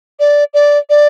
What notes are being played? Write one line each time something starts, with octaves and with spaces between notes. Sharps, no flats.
D5
D5
D5